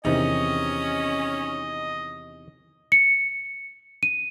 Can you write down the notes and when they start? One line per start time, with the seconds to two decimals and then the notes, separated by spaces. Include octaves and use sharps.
0.05 E2 C3 D#3 C#4 D#4 D#5
2.92 C#7
4.03 D#7